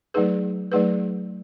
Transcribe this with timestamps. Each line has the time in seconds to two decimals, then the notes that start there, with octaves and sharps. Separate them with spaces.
0.14 F#3 A3 D#4 G#4 B4
0.72 F#3 A3 D#4 G#4 B4